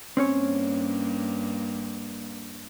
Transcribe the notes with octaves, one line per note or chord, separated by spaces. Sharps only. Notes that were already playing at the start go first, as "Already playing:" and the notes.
G2 A#3 C4 C#4 C#5